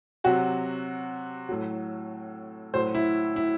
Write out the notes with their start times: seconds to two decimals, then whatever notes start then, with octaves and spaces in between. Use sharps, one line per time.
0.24 C3 F#3 F#4
1.49 A2 F#3
2.74 A2 F#3 C5
2.95 E4
3.36 E4